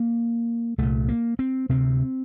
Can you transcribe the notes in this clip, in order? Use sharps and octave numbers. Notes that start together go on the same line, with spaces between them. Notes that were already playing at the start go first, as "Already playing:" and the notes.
Already playing: A#3
C2 A#2 A3
A#3
C4
D2 C3 C4